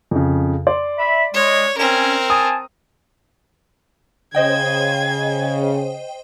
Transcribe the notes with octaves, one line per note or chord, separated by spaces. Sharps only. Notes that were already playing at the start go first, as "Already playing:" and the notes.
F2 C#3
D5 C6
E5 B5
G#3 C#5
C4 C#4 A#4
G#5 A5 D#6
C#3 C5 D#5 G5 G#6